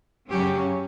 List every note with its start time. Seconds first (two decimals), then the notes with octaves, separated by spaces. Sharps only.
0.30 F#2 C#3 F#3 C#4 G4